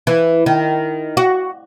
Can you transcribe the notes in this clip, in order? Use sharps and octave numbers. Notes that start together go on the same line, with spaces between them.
E3
D#3
F#4